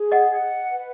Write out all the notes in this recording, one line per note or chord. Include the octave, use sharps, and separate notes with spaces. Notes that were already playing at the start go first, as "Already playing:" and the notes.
Already playing: G#4
D#5 F#5
F#5
B4